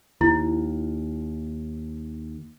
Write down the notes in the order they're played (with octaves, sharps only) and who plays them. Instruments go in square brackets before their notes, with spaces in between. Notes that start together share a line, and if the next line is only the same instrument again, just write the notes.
[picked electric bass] D#2 [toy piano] E4